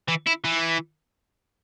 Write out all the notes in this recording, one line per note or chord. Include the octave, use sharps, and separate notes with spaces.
E3
E4
E3